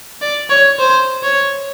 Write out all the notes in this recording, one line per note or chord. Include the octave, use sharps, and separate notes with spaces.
D5
C#5
C5
C#5